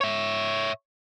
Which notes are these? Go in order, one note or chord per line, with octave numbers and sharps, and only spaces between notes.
C#5 E5